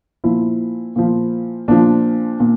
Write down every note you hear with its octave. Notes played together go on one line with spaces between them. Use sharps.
A#2 F3 E4
A#2 F3
A#2 F3 D4
A#2